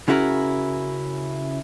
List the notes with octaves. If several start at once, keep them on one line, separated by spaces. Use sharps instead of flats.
C#3 C#4 E4 F#4 A#4